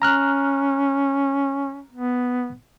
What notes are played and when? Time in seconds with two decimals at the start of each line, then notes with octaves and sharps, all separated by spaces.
0.02 C#4 A#5 F6 F#6
1.93 B3